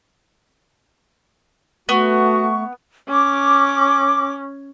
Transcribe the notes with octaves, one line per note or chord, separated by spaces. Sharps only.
A3 B3 F#4 C#6
C#4 D6